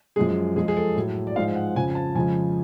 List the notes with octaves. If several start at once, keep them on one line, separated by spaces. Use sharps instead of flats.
F#2 F3 G#3 G#4
F2 F3 G#3 G#4
G#4
A4
A2 F#3
D5
G#2 F3 G#3 F5
F#5
F2 C#3 F3 G#5
G#5
A5
F2 C#3 F3 G#3 G#5